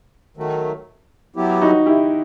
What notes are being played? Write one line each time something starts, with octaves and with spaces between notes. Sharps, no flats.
D#3 F#3 A3
F#3 B3 E4 G4
D#4 F#4
E4 G4